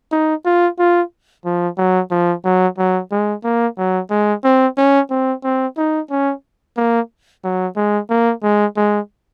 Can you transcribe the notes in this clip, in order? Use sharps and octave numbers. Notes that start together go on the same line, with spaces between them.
D#4
F4
F4
F3
F#3
F3
F#3
F#3
G#3
A#3
F#3
G#3
C4
C#4
C4
C4
D#4
C#4
A#3
F#3
G#3
A#3
G#3
G#3